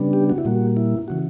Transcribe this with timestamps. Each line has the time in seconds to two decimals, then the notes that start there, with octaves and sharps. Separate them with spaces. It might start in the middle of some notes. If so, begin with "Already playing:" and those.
Already playing: C#3 G3 B3 D4
0.13 G4
0.30 F#4
0.38 E4
0.45 A#2 G3 A#3 F#4
0.77 E4
1.08 C#3 E3 F#4